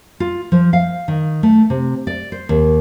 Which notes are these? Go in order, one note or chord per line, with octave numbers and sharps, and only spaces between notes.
F4
F3
F5
D#3
A3
C3
D5
C5
D#2